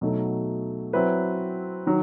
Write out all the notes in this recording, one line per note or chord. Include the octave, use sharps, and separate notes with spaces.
B2 F#3 A3 D#4
F#3 C4 E4 B4
D#3 F#3